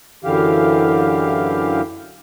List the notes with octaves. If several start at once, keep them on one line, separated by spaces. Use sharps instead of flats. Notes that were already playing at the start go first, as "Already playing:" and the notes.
F#2 D3 E3 G4 F5